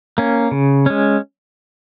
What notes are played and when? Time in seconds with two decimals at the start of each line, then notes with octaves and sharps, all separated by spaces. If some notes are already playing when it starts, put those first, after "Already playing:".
0.18 A#3 C#4
0.51 C#3
0.86 G#3 C#4